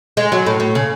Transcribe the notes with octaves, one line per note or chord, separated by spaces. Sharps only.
G#3
F#3
A2
A2
C#3